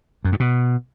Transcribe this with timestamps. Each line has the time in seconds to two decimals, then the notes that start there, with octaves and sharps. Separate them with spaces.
0.25 F#2
0.32 G2
0.40 B2